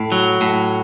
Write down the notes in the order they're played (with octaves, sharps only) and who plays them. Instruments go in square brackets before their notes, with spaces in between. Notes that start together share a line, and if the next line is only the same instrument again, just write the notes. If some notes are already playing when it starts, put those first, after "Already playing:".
Already playing: [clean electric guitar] A2
F#3
A2